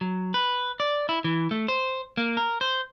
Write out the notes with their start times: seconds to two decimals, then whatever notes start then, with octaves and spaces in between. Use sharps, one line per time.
0.01 F#3
0.34 B4
0.80 D5
1.09 E4
1.24 E3
1.51 A3
1.68 C5
2.17 A#3
2.37 A#4
2.61 C5